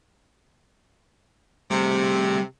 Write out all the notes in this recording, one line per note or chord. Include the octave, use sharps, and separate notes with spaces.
C3 G3 A3